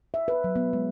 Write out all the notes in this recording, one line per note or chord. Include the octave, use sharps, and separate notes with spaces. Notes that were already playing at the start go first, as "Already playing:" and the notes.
E5
B4
F#3
B3
G#3